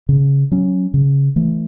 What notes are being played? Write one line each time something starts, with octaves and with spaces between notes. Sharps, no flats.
C#3
F#3 C#4
C#3
E3 A3